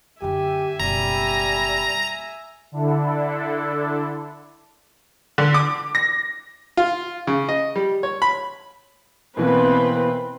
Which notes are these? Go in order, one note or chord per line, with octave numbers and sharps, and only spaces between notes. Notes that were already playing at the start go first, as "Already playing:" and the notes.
F#2 D3 G4 E5 G#5
F#1 B2 G3 A#5
D3 D4 E4 A4
D3
D6
A#6
F4
C#3
D#5
G3
C#5
B5
B2 E3 A#3 C4 B4